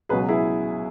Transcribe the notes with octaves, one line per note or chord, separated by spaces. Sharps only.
C#2 B2 F#3 G#4 B4
E4 G#4